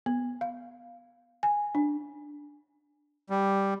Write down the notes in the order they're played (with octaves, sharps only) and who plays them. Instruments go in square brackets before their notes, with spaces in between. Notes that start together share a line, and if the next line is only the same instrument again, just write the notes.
[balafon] B3
F5
G#5
D4
[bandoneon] G3